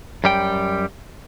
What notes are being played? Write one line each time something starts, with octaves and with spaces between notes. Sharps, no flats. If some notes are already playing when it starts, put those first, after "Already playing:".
F#2 G3 G5